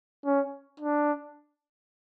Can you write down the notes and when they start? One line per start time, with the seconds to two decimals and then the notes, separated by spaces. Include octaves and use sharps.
0.26 C#4
0.80 D4